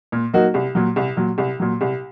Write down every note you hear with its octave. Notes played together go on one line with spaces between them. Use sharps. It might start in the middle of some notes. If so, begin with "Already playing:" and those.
A#2
F#3 A#3 D#4 F#4
C2
A#2 F#3
C2
A#2 F#3
C2
A#2 F#3
C2